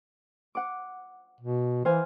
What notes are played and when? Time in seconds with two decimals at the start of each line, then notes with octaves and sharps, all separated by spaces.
0.55 F#5 D6
1.41 B2
1.85 E3 C5 F5 G#5